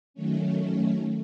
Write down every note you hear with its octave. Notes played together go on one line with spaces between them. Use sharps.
D#3 F#3 A3 C#4